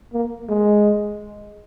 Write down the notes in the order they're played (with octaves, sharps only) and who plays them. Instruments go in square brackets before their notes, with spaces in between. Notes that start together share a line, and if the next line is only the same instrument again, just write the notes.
[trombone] A#3
G#3